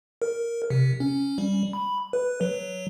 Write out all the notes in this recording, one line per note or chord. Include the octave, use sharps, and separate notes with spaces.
A#4
C3
C#4
G3
B5
B4
F#3